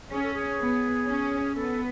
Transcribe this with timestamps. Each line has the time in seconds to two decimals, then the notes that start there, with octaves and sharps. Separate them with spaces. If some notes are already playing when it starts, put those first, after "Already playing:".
0.11 C#4 G#4
0.23 A4
0.34 G#4
0.60 B3
1.08 C#4
1.55 B3 A4